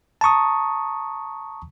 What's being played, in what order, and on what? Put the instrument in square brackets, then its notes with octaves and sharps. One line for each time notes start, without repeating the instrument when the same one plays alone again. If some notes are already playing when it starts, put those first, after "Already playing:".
[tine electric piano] A5 A#5 C#6 D#6